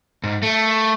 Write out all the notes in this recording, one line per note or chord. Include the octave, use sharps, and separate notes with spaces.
G#2
A3